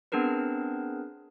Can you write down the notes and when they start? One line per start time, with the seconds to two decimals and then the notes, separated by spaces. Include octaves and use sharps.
0.12 B3 C4 D4 G#4 A#4 B4